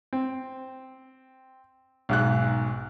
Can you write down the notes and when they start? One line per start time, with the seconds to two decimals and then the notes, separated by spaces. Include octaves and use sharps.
0.13 C4
2.09 B1 G#2 F#6